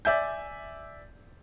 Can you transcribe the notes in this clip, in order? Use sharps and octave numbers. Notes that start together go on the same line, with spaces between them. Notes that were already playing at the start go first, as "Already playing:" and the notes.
D5 E5 G#5 G6